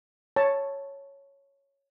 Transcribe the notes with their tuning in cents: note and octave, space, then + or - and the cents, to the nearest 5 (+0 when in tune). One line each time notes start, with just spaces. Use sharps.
C#5 +0 A5 +0